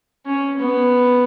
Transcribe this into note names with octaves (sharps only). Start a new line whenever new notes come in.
C#4
B3